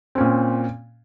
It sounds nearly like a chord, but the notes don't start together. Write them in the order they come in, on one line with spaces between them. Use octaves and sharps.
C4 C#4 A#2